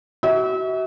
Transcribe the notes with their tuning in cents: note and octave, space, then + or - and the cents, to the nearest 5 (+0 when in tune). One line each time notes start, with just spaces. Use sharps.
F#4 +30 E5 -35